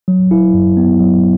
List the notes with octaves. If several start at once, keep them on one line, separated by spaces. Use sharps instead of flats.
F#3
E4
F#2
B3
F#3